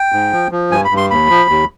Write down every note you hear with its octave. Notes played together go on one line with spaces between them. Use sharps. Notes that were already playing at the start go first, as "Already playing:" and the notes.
Already playing: G5
G#2
F3
F3
G2 G#5
B5
G2
C6
D#2 B5
F3
D#2